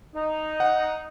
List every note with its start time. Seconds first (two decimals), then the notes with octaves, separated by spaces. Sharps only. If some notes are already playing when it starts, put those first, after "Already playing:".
0.15 D#4
0.60 F#5